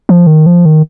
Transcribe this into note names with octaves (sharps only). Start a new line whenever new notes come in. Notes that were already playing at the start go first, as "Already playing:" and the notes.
F3
D#3
F3
D#3